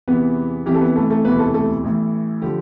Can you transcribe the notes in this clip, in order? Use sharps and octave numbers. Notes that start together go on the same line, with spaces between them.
E2 C3 E3 B3 B4
F1 F2 E3 G3 G4
A4
B3 B4
A3 A4
A3 A4
E1 D2 C3 E3 B3 B4
A3 A4
A3 A4
A1 A2 E3
D3 F3 G3 G4